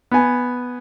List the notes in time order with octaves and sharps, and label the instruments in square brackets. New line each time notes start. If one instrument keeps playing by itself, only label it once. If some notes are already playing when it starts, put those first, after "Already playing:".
[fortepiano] B3 G#5